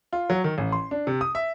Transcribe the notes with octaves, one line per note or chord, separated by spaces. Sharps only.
F4
F#3
D#3
A1
C6
D4
C3
D#6
E5